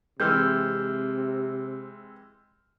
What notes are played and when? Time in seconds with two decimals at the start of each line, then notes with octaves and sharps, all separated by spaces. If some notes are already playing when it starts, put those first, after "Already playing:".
0.20 C3 E3 G#3 C4 E6 F6 G6